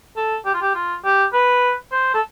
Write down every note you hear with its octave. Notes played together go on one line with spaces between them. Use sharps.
A4
G4
F4
G4
F4
G4
B4
C5
A4